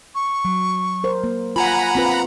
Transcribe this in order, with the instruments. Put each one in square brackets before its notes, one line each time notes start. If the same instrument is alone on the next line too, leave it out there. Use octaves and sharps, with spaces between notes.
[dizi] C#6
[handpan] F#3
A#4 C5
A#3
[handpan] F4 [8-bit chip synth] F#5 A#5 B5 [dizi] G#5
[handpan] C4 F4 B4